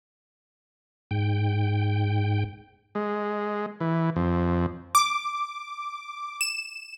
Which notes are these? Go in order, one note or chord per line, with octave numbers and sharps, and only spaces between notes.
G#2 G5
G#3
E3
F2
D6
E7